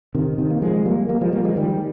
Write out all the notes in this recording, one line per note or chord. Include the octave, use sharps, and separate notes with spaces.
C3 D#3
C3 D#3
A#3
F3 G#3
G3 A#3
G3 A#3
F3 G#3
G3 A#3
F3 G#3
D#3 G3